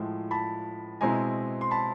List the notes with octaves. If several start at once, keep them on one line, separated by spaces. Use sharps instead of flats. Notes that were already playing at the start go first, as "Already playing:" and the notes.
Already playing: A2 F3 G#3
A5 B5
B2 G#3 C4 E4 G#5 A#5
C6
A5 B5